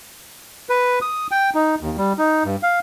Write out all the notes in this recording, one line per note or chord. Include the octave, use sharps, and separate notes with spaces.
B4
D#6
G5
D#4
D#2
G3
D#4
G2
F5